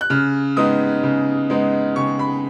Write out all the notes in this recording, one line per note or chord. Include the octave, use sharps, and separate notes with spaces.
F#6
C#3 F6
G#3 B3 D#4 D#6
C#3
G#3 B3 D#4
C#3 C#6
B5